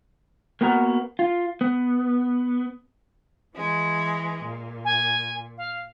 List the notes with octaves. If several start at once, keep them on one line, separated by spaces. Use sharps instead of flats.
A#3 B3 F#4 A#4
F4
B3
E3 G#3
A#2
G#5
F5